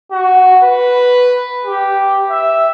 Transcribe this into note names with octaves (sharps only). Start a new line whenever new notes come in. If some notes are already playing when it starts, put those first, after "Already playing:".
F#4
B4
G4
E5